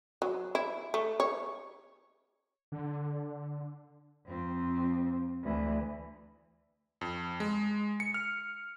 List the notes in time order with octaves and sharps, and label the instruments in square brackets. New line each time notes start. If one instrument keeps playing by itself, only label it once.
[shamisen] F#3
E4
A3
C#5
[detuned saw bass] D3
[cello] F2 C4
D2 E3
[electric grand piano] F2
G#3
C#7
F6